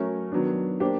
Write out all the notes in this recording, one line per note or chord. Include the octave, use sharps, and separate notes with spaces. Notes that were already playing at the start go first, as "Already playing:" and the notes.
Already playing: F#3 A3 C#4 F#4 A#4
D#3 F#3 B3 D4
A#3 D4 G4 C5